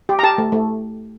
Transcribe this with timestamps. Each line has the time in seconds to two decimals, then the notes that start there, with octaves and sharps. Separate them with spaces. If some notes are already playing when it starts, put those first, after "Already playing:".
0.09 G4
0.19 A#5
0.23 G4 A5
0.38 A3
0.52 A3